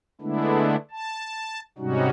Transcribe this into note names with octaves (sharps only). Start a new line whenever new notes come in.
D3 G#3 A3 B3 D4 E4
A5
G#2 C3 G3 C#4 D#4 F#4